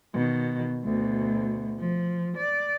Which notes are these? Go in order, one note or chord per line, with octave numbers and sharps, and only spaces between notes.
B2 D#3
D2 B2
F3
D5